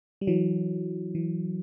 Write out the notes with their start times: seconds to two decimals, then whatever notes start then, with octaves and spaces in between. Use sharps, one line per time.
0.21 G3
0.27 E3 F#3
1.15 E3